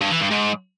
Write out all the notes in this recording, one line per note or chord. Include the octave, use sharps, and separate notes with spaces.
G2
E3
G2
G#2